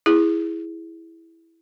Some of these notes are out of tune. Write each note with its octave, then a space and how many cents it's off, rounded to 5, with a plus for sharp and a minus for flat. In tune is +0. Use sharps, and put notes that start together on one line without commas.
E4 +0 G#4 -5